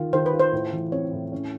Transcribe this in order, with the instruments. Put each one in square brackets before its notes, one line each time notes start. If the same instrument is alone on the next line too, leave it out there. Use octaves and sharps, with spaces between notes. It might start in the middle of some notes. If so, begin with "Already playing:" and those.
Already playing: [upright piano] D#3 F4
[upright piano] D#3 [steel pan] C5
[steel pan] B4
[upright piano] F4
[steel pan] C5
[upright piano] A2
E3
[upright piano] C4 [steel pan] C#5
[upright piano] A2
C#4